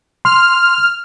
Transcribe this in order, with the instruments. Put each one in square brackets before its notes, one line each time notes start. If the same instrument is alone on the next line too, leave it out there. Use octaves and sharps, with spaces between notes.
[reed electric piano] C6 [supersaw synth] F6